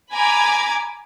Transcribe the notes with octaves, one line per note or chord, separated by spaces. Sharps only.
G#5 A#5 B5 D6 G#6